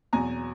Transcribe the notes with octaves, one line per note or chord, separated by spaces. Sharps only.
E2 B2 F#3 G#5 A#5